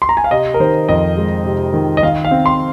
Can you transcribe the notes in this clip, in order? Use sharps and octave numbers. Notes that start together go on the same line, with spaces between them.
C6
A#5
G#5
F5
C3 D#5
A#4
D#3 C5
F2 D#5
G#3
C3
D#3
D#5
D#3 F5
F5
C4
C6